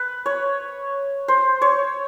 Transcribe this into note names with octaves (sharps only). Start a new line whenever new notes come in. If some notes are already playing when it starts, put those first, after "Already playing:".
Already playing: B4
C#5
C5
C#5